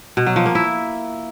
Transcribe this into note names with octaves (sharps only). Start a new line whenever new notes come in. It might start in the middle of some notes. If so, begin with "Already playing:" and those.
B2
F#3
F3
A#3
E4